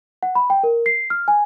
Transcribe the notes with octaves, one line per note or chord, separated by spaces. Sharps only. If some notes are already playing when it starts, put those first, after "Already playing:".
F#5
B5
G5
A#4
C7
F6
G#5